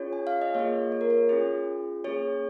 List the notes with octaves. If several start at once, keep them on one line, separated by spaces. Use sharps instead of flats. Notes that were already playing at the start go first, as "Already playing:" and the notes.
Already playing: C#4 F4 G#4 C#5
G#5
F5
D#5
A#3 F4 G#4 C#5
C#5
A#4
C#5
C#4 F4 G#4
A#3 C#4 G#4 C#5